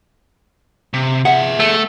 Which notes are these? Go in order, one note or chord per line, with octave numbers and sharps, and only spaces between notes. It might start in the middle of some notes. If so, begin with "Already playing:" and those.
C3
G#4 E5 F#5
A3